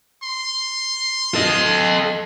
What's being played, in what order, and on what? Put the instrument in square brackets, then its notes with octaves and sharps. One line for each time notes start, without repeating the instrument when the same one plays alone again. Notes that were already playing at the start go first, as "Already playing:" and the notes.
[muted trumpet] C6
[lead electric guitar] A4 D#5